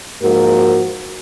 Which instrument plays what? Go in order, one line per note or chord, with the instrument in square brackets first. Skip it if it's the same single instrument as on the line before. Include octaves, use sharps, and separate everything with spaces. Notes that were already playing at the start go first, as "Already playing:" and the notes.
[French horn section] G#2 F3 A#3 F#4 A#4